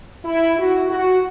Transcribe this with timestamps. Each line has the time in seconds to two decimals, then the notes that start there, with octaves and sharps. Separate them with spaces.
0.25 E4
0.58 F#4
0.91 F#4